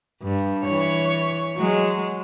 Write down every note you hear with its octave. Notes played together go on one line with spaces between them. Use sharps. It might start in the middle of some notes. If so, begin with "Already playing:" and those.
G2
E3 C#5
F#3 G#3